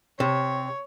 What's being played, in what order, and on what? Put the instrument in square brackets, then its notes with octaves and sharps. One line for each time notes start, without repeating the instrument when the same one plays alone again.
[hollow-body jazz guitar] C3 [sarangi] C#5